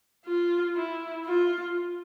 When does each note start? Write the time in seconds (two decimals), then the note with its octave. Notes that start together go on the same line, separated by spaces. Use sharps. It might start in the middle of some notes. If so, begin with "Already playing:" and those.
0.25 F4
0.75 E4
1.26 F4